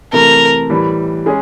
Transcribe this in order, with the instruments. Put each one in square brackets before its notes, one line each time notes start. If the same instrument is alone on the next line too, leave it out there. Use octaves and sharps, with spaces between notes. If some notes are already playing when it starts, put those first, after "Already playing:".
[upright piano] C3 E3 A3 [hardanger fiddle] A#4
[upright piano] A2 E3 G3
G#3 C#4 G#4